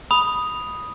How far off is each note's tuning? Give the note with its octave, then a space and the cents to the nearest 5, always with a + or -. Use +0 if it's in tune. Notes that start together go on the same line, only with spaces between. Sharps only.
B5 -5 D#6 +0